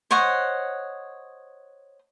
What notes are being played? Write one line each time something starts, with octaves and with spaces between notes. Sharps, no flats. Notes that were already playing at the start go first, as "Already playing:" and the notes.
C5 C#5 D#5 F#5